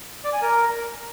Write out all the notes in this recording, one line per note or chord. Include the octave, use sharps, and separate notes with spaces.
D5
G#5
A#4